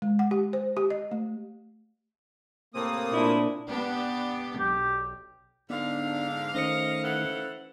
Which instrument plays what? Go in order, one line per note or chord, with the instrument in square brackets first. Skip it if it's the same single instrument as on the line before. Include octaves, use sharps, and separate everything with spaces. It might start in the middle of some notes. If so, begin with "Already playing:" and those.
[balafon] G#3
F#5
G4
C5
G4
D#5
A3
[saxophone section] A2 C3 C4 [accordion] A#3 D#6
[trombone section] A#2 D4 [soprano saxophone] E4
[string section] B3 D4 G4
[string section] B1 [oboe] G4
[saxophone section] G#2 D3 [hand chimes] B3 [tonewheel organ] D4 D#4 [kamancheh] F5
[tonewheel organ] D#3 A3 D#4 [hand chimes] C#4 C5 C#7 [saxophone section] D#5
[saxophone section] E3 A4 F#5